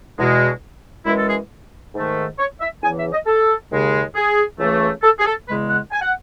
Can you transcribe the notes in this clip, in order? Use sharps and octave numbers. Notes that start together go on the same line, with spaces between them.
E2 B2 G#3
F#2 E3 G#3 E4
A4
G#4
G#2 D#3 A3
C#5
E5
E2 C#3 E3 G#5
E5
D#5
A4
D#2 C#3 G#3
G#4
C#2 C#3 E3 A3
A4
G#4
A4
E2 C#3 G#3 B4
F#5
G#5
F#5